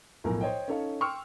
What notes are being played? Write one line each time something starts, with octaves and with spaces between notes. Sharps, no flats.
B1 A2 F3 A#4 G#5
C5 C#5 D#5 G5
C#4 D#4 A4 C#5 F5
G5 C6 C#6 E6 F6